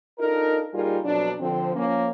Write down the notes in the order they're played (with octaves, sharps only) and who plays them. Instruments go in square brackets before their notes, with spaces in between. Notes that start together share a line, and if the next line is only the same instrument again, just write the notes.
[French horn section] D4 D#4 F4 A4 A#4
A#2 G3 D#4 F4 G#4 A#4
F2 B2 F#3 D4
D3 F3 C4
F3 A#3 C#4